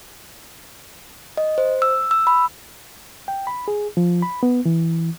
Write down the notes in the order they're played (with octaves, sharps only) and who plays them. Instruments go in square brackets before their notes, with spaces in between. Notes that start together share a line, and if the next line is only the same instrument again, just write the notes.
[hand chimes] D#5
C5
E6
E6
B5
[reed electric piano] G5
B5
G#4
F3
B5
B3
E3